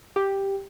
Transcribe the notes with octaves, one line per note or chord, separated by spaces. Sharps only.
G4